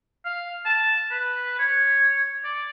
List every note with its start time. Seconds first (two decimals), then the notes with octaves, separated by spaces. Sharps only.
0.25 F5
0.66 A5
1.11 B4
1.59 C#5
2.44 D5